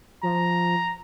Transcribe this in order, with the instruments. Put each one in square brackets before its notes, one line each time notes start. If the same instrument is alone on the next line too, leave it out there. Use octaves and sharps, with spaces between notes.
[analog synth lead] F3 [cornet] A#5